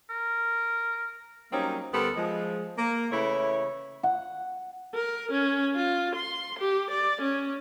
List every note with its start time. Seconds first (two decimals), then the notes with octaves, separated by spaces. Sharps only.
0.10 A#4
1.52 F#3 G3 A#3 C4 C#4 D#4
1.94 D2 G3 B3 A4 A#4 C5
2.17 F3 G#3
2.77 A#3
3.11 C#3 E3 A3 E4 C#5
4.03 F#5
4.94 A#4
5.32 C#4
5.76 F4
6.16 C6
6.59 G4
6.90 D5
7.21 C#4